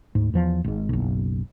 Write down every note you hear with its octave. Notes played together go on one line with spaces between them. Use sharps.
D2 G#2
E2 F3
G#1 G#2
F#1 B1